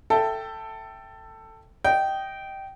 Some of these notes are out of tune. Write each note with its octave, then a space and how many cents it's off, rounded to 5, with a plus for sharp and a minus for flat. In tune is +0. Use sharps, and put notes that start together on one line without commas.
A4 +10 E5 +5 G5 +0
D#5 +0 G5 -15